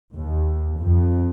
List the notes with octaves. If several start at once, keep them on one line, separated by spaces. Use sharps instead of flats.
D#2
F2